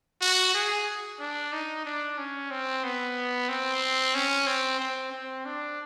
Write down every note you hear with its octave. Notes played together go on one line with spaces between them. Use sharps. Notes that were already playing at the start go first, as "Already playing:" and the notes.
F#4
G#4
D4
D#4
D4
C#4
C4
B3
C4
C#4
C4
C4
C4
D4